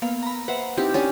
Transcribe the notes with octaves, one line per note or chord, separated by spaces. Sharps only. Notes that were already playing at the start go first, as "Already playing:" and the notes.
A#3 B3 F5
A#5 B5
B4 C5 E5 F#5
C4 D#4 E4 G4
C#4 D4 G4